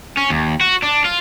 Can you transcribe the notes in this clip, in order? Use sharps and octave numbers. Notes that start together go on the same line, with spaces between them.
C#4
D#2
F#4
D4
F4